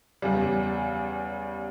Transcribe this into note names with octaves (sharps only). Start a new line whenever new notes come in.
E2 C#3 G3